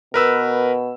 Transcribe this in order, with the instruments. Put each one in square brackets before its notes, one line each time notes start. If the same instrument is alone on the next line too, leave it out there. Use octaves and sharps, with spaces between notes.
[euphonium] B2 [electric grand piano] A#4 B4 E6